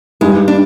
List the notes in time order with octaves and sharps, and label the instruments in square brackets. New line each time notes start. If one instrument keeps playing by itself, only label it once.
[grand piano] G2 D#3 G3 [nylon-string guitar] G#3
[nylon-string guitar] D4